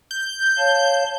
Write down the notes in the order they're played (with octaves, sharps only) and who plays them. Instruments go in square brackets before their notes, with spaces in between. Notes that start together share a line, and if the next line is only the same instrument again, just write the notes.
[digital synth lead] G6
[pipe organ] C#5 F5 A5